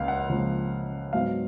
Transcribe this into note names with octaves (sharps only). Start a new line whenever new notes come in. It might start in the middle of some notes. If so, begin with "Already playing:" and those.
Already playing: C#2 C#3 A#3 F5
F#5
C#2 C#3 F3 A#3
G#2 F#3 B3 F5